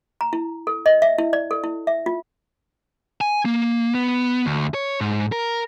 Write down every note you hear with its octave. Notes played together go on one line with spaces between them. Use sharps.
A#5
E4
A4
D#5
E5
E4
D5
A4
E4
E5
F4
G#5
A#3
B3
D2
C#5
G#2
A#4